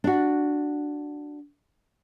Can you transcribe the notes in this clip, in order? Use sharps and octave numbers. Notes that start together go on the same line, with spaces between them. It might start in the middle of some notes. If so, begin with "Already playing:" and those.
D4 F#4